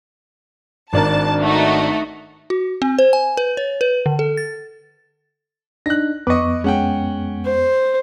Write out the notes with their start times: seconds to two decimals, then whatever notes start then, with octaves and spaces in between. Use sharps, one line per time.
0.93 G#1 D4 A#4 A5
1.41 A3 D#4 F#4
2.50 F#4
2.82 C4
2.99 C5
3.13 G#5
3.37 B4
3.57 C#5
3.81 B4
4.06 D3
4.19 A4
4.37 A6
5.86 D4 D#4 F#6 A#6
6.27 F2 B3 B4 D#5 C#6 D6
6.64 G#3 C#4 F#5 G5
7.45 C5